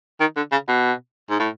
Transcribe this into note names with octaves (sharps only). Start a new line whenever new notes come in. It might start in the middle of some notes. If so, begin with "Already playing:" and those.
D#3
D3
C#3
B2
G#2
A2